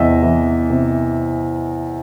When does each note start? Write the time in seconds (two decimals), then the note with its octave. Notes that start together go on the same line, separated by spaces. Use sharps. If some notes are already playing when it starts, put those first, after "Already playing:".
Already playing: E2 C3 D#5 E5
0.23 E3
0.70 C3